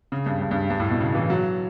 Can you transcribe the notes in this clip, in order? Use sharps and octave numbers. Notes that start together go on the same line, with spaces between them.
C#3
G2
G2
G2
G2
A2
B2
C#3
E3
F#3